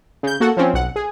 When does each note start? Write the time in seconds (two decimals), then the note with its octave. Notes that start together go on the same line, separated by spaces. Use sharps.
0.23 C#3 G6
0.40 A#3 F#4 A4 F#5
0.57 F3 C4 C#4
0.74 B1 F#5
0.96 G#4